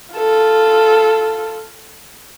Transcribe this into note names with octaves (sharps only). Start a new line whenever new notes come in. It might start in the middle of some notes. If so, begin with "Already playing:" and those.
F4 A4